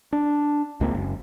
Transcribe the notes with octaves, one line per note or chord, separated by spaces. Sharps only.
D4
C#2 G#3 A#3 C4
F#1